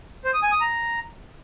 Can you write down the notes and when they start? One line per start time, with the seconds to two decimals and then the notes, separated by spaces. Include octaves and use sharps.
0.25 C5
0.34 D#6
0.43 G#5
0.52 D#6
0.61 A#5